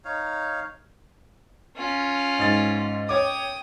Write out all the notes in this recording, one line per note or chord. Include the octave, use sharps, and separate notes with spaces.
D#4 C#5 F5
C#4 F4
G#2 A6
C#5 G5 D6 D#6